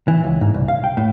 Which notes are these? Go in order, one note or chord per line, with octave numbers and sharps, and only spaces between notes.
E3
C#2
G#2
C2
F5
G5
A2